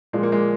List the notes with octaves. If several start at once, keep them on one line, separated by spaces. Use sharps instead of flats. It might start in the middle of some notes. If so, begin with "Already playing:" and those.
A#2 F3 G#3
A#3
G#3